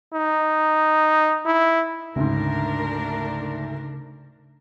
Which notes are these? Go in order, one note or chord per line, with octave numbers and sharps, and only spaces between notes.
D#4
E4
D2 G#2 C#3 A3 D4 A#4